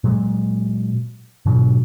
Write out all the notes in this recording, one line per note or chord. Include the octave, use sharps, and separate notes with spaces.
A#2 F#3 G#3
G#2 B2 D3 F#3